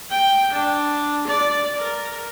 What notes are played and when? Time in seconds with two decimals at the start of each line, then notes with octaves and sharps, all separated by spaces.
0.11 G5
0.52 D4
1.27 D5
1.78 A#4